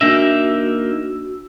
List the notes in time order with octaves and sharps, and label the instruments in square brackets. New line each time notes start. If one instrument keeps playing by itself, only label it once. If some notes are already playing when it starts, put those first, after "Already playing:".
[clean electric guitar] A#3 D#4 E5 [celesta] D4 A#6 [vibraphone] F#4 E6